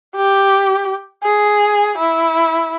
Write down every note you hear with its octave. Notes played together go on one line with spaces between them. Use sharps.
G4
G#4
E4